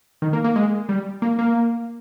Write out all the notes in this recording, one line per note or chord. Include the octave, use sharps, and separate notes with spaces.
D#3
A#3
A#3
G#3
G3
A#3
A#3